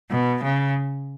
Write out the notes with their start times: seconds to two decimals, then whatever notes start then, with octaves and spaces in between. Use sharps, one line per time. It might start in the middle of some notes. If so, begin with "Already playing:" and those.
0.10 B2
0.42 C#3